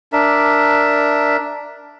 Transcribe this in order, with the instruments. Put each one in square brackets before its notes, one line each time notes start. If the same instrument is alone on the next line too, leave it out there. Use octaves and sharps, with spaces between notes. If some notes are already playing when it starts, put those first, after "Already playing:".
[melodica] D4 A#4 E5